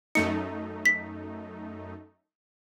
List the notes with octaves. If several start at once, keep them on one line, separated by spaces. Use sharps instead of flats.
F#2 A3 D#4 C#7
B6